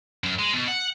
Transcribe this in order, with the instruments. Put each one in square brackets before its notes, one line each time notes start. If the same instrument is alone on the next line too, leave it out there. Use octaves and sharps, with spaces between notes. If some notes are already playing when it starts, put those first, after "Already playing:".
[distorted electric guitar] F#2
G#3
B2
F#5